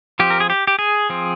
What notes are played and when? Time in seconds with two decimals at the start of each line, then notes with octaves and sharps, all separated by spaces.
0.20 F3 C4 G4
0.30 A#4
0.40 G#4
0.50 G4
0.67 G4
0.79 G#4
1.10 F3 C4